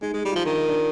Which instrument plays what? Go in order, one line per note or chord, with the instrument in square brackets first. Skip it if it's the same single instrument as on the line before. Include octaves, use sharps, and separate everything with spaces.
[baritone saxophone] G#3 [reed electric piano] D#4
[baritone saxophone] G#3
G3
[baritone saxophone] F3 [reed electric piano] F4
[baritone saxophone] D#3 [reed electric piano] D4
[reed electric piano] D#4
D4